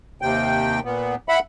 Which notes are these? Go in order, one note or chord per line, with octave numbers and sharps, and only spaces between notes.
D#2 C3 G5
A#2 B3
E5 F#5 B5